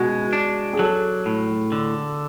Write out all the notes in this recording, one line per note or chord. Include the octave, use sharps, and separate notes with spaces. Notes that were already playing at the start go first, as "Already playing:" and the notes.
Already playing: B2 G#3 F#4
D4
G#4
F#3 A4
A2
D3